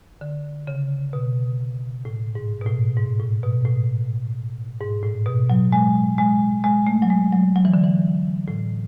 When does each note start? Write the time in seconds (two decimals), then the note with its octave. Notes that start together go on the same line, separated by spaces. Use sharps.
0.21 D3
0.67 C#3
1.13 B2
2.05 A2
2.35 G#2
2.61 B2
2.66 A2
2.97 G#2
3.20 A2
3.43 B2
3.65 A2
4.81 G#2
5.03 A2
5.26 B2
5.50 F#3
5.72 G#3
6.18 G#3
6.64 G#3
6.87 A3
7.02 F#3
7.10 G#3
7.32 F#3
7.56 F#3
7.65 E3
7.74 D3
7.83 E3
8.48 A2